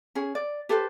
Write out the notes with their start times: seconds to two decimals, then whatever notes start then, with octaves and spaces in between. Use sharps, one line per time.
0.15 C#4 G#4
0.35 D5
0.69 G4 A4 B4 C5